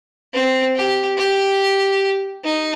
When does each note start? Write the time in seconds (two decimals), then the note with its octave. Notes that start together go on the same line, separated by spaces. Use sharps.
0.34 C4
0.76 G4
1.18 G4
2.44 D#4